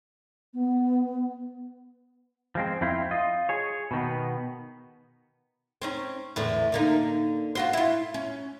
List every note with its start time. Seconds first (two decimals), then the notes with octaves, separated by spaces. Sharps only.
0.53 B3
2.55 F3 G#3 C4
2.81 F2 C4 E4 F4 C5
3.11 F4 D#5
3.49 G#4 C#5
3.91 B2 D#3 B3
5.82 C4 C#4 D#4
6.36 E2 A2 D3
6.72 D3 A#3 D#4
7.55 F4 F#4 C5
7.73 E4 F4
8.14 C#4